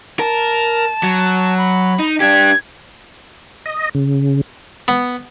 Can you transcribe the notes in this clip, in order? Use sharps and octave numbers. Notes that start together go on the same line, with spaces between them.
A#4 A5
F#3
B5
D#4
D4 G4 G#6
D#5
C#3
B3